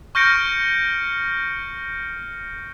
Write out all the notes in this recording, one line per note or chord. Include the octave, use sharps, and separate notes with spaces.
C#6 F6 G6 A#6 C#7 D7